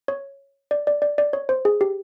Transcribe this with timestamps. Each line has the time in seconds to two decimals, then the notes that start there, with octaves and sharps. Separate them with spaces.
0.08 C#5
0.71 D5
0.87 D5
1.02 D5
1.18 D5
1.33 C#5
1.49 C5
1.65 G#4
1.81 G4